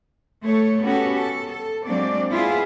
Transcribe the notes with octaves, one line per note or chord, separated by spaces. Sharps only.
A3 A4 C#5
B3 C#4 F#4 G4 A4
A4
A4
F#3 G#3 A#3 C4 D4 D5
B3 E4 F4 G#4